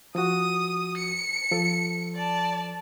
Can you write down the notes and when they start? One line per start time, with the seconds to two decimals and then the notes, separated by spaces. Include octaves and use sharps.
0.15 F3 F#4 D#6
0.97 C#7
1.51 F3 A4
2.16 D5 A5